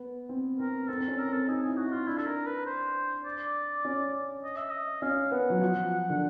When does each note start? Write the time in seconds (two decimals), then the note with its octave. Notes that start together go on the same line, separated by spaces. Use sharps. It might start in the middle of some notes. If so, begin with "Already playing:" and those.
Already playing: B3
0.29 C4
0.59 C4 A#4
0.88 C4 A4
1.00 C4
1.08 C#4
1.19 A#4
1.28 C4
1.33 A4
1.47 D#4 G#4
1.63 G#4
1.68 E4
1.78 F#4
1.87 D#4 F4
2.07 D4 E4
2.18 A4
2.26 A#4
2.46 B4
2.66 C5
3.25 D5
3.85 C#4
4.44 D#5
4.57 E5
4.70 D#5
5.02 C#4 F5
5.32 B3 F#5
5.50 F#3
5.61 F3
6.10 D3